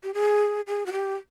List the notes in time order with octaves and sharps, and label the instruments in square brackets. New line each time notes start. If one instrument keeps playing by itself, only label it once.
[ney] G4
G#4
G#4
F#4
G4